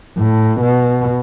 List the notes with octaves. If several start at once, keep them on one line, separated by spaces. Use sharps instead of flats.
A2
B2